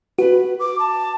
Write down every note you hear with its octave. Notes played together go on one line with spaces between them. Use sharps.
F#4 B4
D6
A5